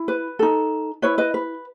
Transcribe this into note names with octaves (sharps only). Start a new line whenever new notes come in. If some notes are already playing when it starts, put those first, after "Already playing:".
Already playing: E4
B4
D#4 A4
E4 B4 C#5
B4 D#5
B4